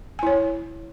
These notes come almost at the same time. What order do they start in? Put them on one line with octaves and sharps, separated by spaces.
G#5 E4 C#5